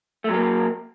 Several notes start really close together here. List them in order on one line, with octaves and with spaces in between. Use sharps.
A3 F#3 A#3